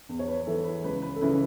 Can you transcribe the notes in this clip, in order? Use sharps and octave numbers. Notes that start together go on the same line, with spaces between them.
E2
C#5
B4
E3 A4
B4
C#2 B4
B4
A4
C#3 E3 B4